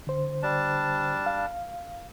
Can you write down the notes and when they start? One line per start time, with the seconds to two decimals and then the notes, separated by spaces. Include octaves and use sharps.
0.07 D3 C5
0.43 G3 D4 A5
1.26 F5